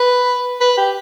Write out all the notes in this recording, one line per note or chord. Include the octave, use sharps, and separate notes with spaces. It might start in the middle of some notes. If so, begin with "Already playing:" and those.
Already playing: B4
B4
G4